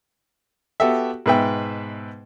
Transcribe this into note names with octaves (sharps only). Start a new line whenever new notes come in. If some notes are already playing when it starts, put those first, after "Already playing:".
B3 F#4 G4 A4 E5
G#2 B2 B4 E5 G5